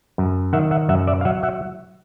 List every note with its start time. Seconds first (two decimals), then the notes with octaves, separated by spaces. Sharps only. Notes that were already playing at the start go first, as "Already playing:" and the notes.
0.18 F#2
0.53 D#3 E5 F#5
0.71 E5 F#5
0.89 F#2 E5 F#5
1.07 D5 E5
1.21 F5
1.25 F#3 E5 F#5
1.43 E5 F#5